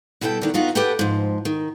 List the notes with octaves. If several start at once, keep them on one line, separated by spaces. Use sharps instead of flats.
B2 G3 E4 A4 B4 G5
D3 D#3 B3
B3 D#4 F4 F#4
G4 A4 B4 F#5 G5
G#2 F3
D#3